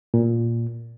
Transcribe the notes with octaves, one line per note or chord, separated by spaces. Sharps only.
A#2